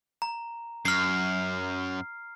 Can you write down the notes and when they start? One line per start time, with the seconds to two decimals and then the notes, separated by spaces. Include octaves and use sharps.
0.22 A#5
0.85 F#2 F6 C7